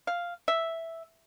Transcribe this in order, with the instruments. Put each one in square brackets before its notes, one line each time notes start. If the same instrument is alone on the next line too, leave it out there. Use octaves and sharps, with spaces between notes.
[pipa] F5
E5